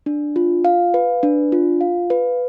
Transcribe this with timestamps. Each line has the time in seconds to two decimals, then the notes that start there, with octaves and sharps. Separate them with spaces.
0.06 D4
0.36 F4
0.65 F5
0.94 B4
1.23 D4
1.52 F4
1.81 F5
2.10 B4